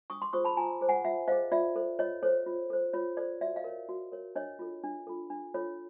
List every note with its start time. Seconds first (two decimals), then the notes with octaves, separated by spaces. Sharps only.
0.10 D4 C#6 D#6
0.22 C6 D6
0.33 F4 G#4 C5 C#6 D#6
0.45 A5 B5
0.57 F4 G#5 A#5
0.81 G#4 C5
0.89 F#5 G#5
1.04 F4 E5 F#5
1.28 C5 D#5 F5
1.32 G#4
1.52 F4 D5 E5
1.76 A4 C5
1.99 F4 C#5 D#5
2.23 A4 C5 C#5
2.47 F4
2.70 A4 C5
2.93 F4 C#5
3.17 A4 C5 D5
3.41 F#4 D5 E5
3.56 D#5 F5
3.64 A#4 C#5
3.89 F#4
4.12 A#4 C#5
4.35 D4 C#5 D#5
4.59 F4 A4
4.84 D4
5.07 F4 A4
5.30 D4
5.54 F4 A4 C#5